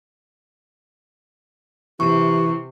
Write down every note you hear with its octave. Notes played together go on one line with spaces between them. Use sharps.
C3 E3 G4 C#6